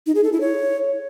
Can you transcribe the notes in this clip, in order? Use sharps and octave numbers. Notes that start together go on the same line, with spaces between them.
D#4
G#4
A4
E4
C#5